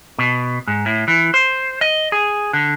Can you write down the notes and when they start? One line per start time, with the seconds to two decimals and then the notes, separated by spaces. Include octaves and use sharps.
0.18 B2
0.67 G#2
0.86 A2
1.08 E3
1.34 C5
1.81 D#5
2.12 G#4
2.53 D3